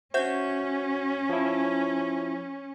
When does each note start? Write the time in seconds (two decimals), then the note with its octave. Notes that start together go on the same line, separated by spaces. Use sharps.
0.14 C#4 F#4 C5 E5 G6
1.29 F3 E4